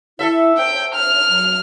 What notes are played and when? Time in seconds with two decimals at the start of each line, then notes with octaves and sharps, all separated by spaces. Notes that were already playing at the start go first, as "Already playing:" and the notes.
0.19 E4 A4 E5
0.58 C5 G5
0.94 F6
1.29 F#3